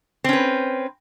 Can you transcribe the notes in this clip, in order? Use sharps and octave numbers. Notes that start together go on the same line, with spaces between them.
C4 C#4 B4